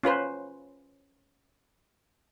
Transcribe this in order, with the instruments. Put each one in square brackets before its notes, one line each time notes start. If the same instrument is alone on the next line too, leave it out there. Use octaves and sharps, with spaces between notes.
[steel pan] C#4 F4 B4 C5